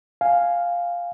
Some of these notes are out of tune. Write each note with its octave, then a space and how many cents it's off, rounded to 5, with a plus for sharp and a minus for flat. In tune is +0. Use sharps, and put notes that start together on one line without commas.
F5 +0 G#5 +0